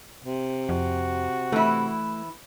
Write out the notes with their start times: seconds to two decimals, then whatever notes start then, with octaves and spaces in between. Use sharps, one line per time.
0.24 C3
0.69 F2 F#4
1.52 E3 A3 E4